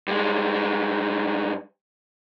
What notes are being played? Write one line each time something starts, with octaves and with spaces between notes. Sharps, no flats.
G2 G#3